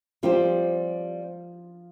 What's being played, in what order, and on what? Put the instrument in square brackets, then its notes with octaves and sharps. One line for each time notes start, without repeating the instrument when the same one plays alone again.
[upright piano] F3 F4 [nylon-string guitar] G3 C4 G4 C5